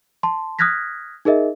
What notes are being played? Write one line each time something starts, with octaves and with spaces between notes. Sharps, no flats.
A5 C6
D#6 F6 F#6 G#6 A#6 B6
D#4 G#4 A#4 D#5 E5